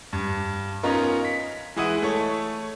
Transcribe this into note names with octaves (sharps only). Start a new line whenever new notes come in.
G2
B3 C#4 D#4 F4 A#4
B6
E3 G#3 E4 F#5 D#6 D#7
A3 A4 C#5